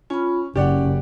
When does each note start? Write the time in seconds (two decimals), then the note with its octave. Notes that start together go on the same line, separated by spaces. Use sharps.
0.10 C#4 F4 B5
0.56 F#1 C#4 G4 D5 F#5